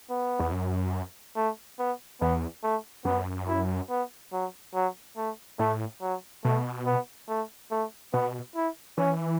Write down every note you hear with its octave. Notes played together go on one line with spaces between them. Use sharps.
B3
E2
F#2
A3
B3
E2 B3
A3
F#2 B3
E4
B3
F#3
F#3
A3
A2 A3
F#3
B2 A3
B3
A3
A3
B2 B3
E4
E3 C#4